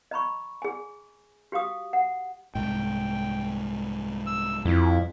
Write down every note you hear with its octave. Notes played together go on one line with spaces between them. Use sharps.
D#5 A#5 B5 C#6
G#4 G#5
F#4 G4 F5 D#6
F#5
C2 G#2 G5
E6
F2 E4